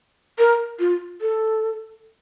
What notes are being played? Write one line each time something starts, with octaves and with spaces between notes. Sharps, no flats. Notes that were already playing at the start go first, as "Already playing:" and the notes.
A#4
F4
A4